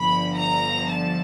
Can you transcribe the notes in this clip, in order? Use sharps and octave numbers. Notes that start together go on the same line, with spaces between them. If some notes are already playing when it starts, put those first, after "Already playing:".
Already playing: G1 G2 D3 F3 B5
A#5
A5